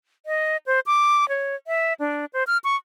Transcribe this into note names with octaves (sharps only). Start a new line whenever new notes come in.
D#5
C5
D6
C#5
E5
D4
C5
F6
C#6